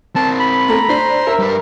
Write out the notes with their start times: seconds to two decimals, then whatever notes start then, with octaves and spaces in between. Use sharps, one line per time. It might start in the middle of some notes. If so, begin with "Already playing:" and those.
0.16 C4 A#4 A5
0.40 B5
0.69 A3 A4 A#5
0.89 D4 C5
1.27 A#4 E5
1.39 G3 B4